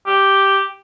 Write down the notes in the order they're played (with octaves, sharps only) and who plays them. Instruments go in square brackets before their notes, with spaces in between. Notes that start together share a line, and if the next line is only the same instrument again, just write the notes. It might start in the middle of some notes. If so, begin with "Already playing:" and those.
[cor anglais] G4